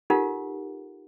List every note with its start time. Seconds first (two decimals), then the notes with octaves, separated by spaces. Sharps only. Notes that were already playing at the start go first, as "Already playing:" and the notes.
0.10 D#4 F4 G4 A4 A#4 F#5